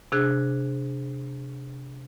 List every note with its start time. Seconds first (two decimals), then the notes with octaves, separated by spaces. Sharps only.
0.12 C3 D4 G#4 F#6